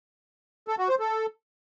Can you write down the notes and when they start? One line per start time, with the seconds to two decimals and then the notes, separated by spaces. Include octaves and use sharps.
0.68 A4
0.78 F#4
0.89 C5
0.99 A4